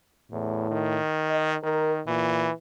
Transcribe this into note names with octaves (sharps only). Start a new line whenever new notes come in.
E2 A2
D#3
D#5
D#3 A#4
A#2 E3